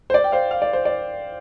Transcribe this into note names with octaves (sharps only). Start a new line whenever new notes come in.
C5
D5
G5
C5 F5
F5
D5
C5
D5